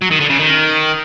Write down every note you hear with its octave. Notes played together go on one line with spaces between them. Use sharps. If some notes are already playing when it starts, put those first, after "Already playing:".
F#3
D#3
D3
C#3
D#3